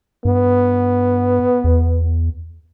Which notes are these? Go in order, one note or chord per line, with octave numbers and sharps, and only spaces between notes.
G2 B3
E2